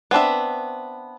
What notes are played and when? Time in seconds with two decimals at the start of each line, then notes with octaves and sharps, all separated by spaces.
0.11 B3 C4 D4 E5